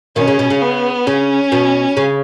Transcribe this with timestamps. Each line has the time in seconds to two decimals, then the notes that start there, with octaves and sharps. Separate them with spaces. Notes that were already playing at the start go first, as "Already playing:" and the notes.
0.16 B2 D#3 C#4
0.28 C#3
0.39 B2
0.50 C#3
0.61 B3
1.06 C#3 C#4
1.52 B2
1.97 C#3